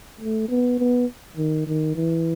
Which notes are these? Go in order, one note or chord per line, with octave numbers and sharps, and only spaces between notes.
A3
B3
B3
D#3
D#3
E3